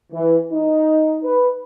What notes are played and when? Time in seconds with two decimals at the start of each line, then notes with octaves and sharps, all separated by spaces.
0.12 E3
0.52 D#4
1.23 B4